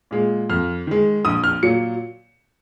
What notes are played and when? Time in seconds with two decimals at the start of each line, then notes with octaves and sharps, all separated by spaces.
0.11 A#2 G#3
0.50 F2 F6
0.87 D#3 G#3
1.25 A#1 D#6
1.44 F6
1.63 A#2 F#3 C#7